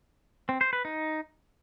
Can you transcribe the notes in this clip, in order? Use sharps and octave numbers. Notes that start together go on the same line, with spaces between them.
C4
C5
B4
D#4